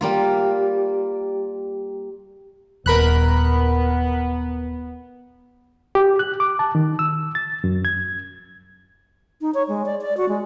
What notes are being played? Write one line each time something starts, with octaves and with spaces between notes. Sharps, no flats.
G3 A#3 F4
D#1 B3 A#4 B5 F#6
G4
F#6
D6
A5
D#3
E6
A6
F#2
G#6
D#4
C#5
G#3
D5
D5
F#4
G#3